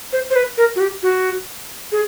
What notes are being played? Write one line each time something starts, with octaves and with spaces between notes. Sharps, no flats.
C5
C5
B4
A#4
F#4
G4
F#4
G#4